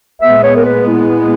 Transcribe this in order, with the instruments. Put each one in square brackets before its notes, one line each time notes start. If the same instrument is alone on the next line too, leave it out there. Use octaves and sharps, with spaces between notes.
[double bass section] A#2 G#3 B3 [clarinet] E5
[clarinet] C#5
A#4
B4
E4